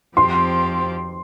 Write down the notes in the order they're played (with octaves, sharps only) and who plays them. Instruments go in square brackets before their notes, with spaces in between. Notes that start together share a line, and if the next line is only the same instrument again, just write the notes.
[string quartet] F2 F3 C4 G4 [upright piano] C6